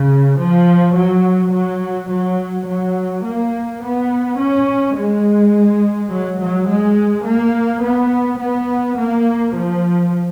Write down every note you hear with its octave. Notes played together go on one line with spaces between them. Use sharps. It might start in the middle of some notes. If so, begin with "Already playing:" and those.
Already playing: C#3
F3
F#3
F#3
F#3
F#3
A#3
B3
C#4
G#3
F#3
F#3
G#3
A#3
B3
B3
A#3
F3